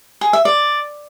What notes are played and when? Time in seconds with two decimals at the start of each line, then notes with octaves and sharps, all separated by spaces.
0.21 G#4
0.33 E5
0.45 D5